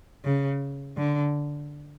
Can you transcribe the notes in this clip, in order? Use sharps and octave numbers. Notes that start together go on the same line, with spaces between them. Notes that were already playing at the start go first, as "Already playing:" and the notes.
C#3
D3